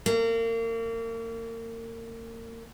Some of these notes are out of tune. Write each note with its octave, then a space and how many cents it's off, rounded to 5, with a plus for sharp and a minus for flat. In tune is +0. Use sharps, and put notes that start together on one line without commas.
A#3 -35